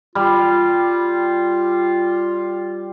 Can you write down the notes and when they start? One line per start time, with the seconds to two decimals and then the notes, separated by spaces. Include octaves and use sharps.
0.15 G3 F4